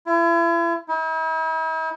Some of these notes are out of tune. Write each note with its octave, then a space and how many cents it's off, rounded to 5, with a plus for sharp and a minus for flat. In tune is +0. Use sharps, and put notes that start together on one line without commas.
E4 +40
E4 -45